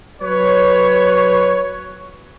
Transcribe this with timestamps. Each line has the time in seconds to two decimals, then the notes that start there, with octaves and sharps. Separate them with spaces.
0.22 F#3 B4 C#5